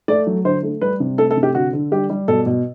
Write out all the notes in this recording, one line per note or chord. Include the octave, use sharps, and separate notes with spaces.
A3 D5
F#3
D3 C5
A3
G3 B4
C3
A3 A4
A4
C3
G4
D3 F#4
D3
G3 G4
G3
B2 A4
B2